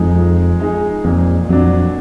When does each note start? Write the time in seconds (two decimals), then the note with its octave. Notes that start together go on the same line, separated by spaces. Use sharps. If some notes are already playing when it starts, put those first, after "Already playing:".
Already playing: F2 F3 G#3 D#4 G#4
0.15 F3
0.60 G#3 D#4 G#4
1.04 F2 A#2
1.49 F2 F#3 D4